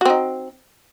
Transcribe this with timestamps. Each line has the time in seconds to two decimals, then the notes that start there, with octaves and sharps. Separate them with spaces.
0.01 F#4
0.05 C4
0.10 D#4